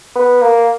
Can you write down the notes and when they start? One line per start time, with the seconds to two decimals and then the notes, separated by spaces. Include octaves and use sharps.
0.15 B3
0.41 A#3